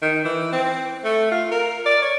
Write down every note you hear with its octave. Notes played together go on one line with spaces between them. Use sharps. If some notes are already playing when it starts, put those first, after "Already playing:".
D#3
E3
C4
A3
F4
A#4
D5
C#5